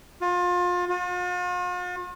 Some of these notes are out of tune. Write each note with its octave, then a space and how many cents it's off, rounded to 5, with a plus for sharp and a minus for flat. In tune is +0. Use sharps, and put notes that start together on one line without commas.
F4 +30
F4 +45